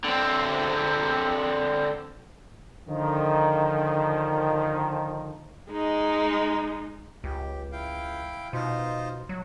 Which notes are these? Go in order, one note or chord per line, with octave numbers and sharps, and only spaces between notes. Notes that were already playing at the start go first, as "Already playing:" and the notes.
D3 C4
D3 D#3 F3
G#3 D#4
C#2 G4
E4 F5 G5
B2 D#4 F4 C5
F#3